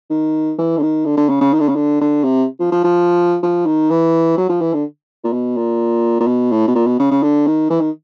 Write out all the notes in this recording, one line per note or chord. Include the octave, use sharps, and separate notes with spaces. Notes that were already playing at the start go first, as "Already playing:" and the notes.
D#3
E3
D3
D#3
D3
D3
C#3
C#3
D#3
D3
C#3
D3
D3
C3
F3
F3
F3
F3
D#3
E3
F#3
F3
E3
D3
A#2
B2
A#2
A#2
B2
A2
B2
A#2
B2
C#3
C#3
D3
D#3
E3
D#3